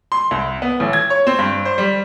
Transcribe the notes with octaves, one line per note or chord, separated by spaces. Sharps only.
C6
C2
B3
A1
G#6
C#5
C4
G2
C5
G3